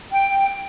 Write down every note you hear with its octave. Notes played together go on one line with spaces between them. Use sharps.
G5